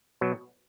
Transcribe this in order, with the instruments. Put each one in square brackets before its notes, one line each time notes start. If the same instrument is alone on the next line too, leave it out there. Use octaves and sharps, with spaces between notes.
[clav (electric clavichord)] B2 F#3